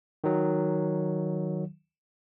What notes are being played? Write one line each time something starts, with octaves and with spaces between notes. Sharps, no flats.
D#3 F#3